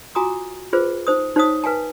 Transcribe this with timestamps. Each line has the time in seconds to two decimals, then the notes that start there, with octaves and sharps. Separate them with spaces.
0.15 F4 F#4 G#5 A#5 D6 D#6
0.73 F4 G#4 B4 C5
1.07 D#4 C5 D#6
1.36 D#4 C5 C#5 F5 A5 D#6
1.64 B4 F5 G#5 A5